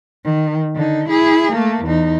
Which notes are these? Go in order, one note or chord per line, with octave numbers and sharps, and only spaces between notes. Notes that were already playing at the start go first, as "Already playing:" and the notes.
D#3
D3 D#4
E4 G#4
A3 A#3
E2 D#4